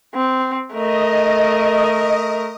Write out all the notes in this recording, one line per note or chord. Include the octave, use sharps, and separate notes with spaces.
C4
A3 A#4 D#5